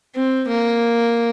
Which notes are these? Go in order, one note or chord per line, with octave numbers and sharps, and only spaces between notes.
C4
A#3